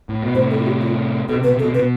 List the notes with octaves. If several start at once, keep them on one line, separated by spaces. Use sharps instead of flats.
A2
B2
A2 C3 C5
A4
F4
G4
F4
B2 A4
C3
B2 B4
C3
A4
B2
C3
B4
B2